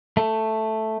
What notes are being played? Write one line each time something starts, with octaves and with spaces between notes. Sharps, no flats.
A3